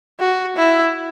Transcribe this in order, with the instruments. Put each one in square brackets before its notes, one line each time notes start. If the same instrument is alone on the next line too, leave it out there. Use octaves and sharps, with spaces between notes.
[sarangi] F#4
E4